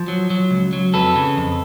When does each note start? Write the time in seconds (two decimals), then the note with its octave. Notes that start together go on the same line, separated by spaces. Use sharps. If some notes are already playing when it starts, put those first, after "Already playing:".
Already playing: F3
0.08 F#3
0.30 F#3
0.51 C#2
0.73 F#3
0.94 F2 A4 B4
1.16 C#3
1.37 F2